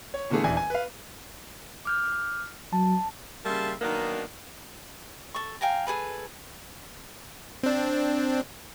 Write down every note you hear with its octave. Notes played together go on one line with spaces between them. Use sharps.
C#5
A#2 D3 E3 A3 G#4
D#1 E2 D4 E4 G#5
G#5
B4 F5
D6 F6 G6
F#3 A5
C#3 G3 A#3 E5 A5 C6
D#3 F#3 A#3 B3 D4 D#4
A4 C#6
F5 G5 G#5 A#5
G#4 A4 B4
C4 D4